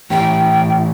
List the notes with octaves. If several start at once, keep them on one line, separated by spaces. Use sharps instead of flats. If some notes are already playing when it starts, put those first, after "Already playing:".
A2 E3 G4 G5